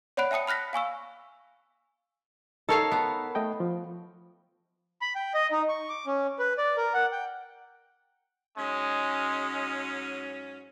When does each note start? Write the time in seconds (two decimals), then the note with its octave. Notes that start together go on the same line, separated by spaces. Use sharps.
0.17 C#5 D5 F#5 B5 F#6 D7
0.31 E5 G5 A5 D#6 C#7
0.47 B5 F6 F#6 A#6 B6
0.73 F5 G#5 C#6 E6
2.69 D#4 A4 A#4 C#5 F5 A#5
2.92 B3
3.35 A3 D#5 G5
3.60 F3
5.02 B5
5.15 G5
5.34 D#5
5.52 D#4
5.69 C#6
5.89 D6
6.06 C#4
6.39 B4
6.58 D5
6.77 A#4
6.94 F#5
7.12 G5
8.57 G#2 F#3 G#3 C#4